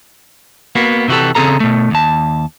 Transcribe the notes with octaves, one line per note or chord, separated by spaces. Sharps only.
A#3 B3 F#4
C3 E3 F#4 G4 A4
C#3 C4 G#4 A4 A#5
B2 A3
D#2 A5